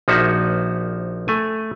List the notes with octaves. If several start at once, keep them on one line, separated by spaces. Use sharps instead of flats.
A#1 F3 A#3 D#4 F#4 E5
A3 G#5